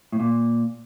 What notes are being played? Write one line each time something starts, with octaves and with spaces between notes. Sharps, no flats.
A2
A#2